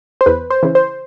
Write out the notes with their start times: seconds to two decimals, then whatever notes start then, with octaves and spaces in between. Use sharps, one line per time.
0.21 C5
0.26 E2 B4
0.50 C5
0.63 C#3 E3
0.75 C5